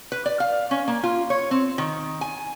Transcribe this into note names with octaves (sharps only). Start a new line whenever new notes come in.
B4
D5
F5
C#4
A#3
F4
C#5
C4
D#3
G#5